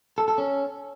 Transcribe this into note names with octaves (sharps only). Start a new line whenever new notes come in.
A4
A4
C#4